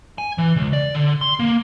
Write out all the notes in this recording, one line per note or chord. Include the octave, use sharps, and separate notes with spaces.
G#5
E3
C#2
D5
D3
C6
A#3